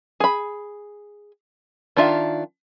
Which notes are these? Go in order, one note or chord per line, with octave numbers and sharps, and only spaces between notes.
G#4 B5
D#3 D4 F4 E5 F5